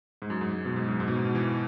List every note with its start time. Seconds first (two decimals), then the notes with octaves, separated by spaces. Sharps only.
0.22 G#2
0.30 F#2
0.41 G#2
0.53 G#2
0.65 B2
0.76 G#2
0.88 F#2
1.00 G#2
1.08 B2
1.16 G#2
1.25 B2
1.35 E3